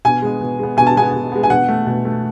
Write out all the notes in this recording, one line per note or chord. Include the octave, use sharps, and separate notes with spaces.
B2 G#5
G#3 B3
B2
G#3 B3
B2 G#5
A5
G#3 B3 G#5
B2
G#3 B3
G#5
B2 F#5
A3
B2
A3